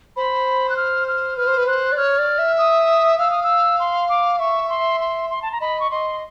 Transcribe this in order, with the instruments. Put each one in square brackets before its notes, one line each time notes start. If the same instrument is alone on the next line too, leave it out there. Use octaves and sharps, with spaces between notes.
[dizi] C5 [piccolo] B5
[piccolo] F#6
F6
F6
[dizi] B4 [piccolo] F6
[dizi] C5
B4
[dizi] C5 [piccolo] F#6
[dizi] D5
[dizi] C#5 [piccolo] F6
[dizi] D5
E5
[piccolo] D#6
[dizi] F5 [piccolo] E6
[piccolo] D#6
E6
C6
D6
[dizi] E5 [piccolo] C#6
[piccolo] C6
C6
C6
A5
A#5
[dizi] D#5 [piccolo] B5
[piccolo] C#6
[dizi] D#5 [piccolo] C6